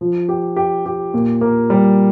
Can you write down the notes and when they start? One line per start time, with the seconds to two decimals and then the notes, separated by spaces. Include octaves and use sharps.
0.01 F3
0.29 G4
0.56 G4
0.86 G4
1.14 A#2
1.41 A#3
1.70 G3